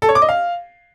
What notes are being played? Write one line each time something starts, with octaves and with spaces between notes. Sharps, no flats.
A4
C#5
D6
D#5
F5